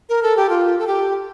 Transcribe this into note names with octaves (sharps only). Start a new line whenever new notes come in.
A#4
A4
G4
F4
A4
G4